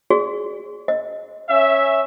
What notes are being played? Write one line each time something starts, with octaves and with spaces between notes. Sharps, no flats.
F#4 G#4 D5
D#5
C#4 E5